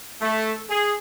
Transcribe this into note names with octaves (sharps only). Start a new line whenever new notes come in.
A3
G#4